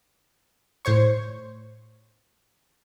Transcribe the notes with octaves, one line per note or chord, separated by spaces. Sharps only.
A2 C5 C#5 C#6